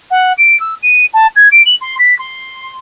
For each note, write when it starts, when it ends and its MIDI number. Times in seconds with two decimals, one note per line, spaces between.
0.10 0.32 78
0.38 0.58 98
0.59 0.74 88
0.82 1.05 99
1.13 1.27 81
1.36 1.48 92
1.51 1.61 98
1.66 1.75 102
1.81 1.95 84
1.98 2.16 95
2.18 2.78 84